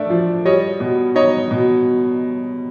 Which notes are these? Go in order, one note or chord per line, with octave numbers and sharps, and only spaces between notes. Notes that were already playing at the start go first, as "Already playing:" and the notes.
Already playing: A3 D4 D5 E5
F3
G3 C#5 D#5
B2
D#4 C#5 D#5
B2